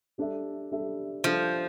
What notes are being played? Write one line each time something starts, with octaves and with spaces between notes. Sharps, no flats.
G3 D4 A4 E5
G3 D4 A4 E5
F3 G3 D4 A4 E5